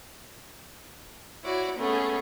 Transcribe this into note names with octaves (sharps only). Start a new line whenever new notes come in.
E4 F#4 C#5 D5
A3 B3 C#4 G#4